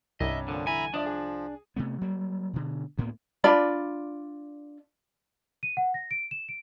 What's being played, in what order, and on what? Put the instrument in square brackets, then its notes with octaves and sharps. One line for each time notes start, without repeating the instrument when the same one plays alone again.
[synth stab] C2 [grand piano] G2 C#4 A#5 [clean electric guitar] D#5 [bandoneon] E5
[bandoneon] A#2 F3 [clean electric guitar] D3
[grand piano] D3 E3 [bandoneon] E5 A#5 B5 [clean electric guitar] G#5
[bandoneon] F3 [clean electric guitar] D4 [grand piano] D5 E5 D#6
[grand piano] G#4
[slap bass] C3 A3 B3
F#3 G3 A#3
B2 D3
D2 A2 A#3 B3
[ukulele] D4 F4 D5 B5
[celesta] D#7
F#5
A#6
D7
E7
D7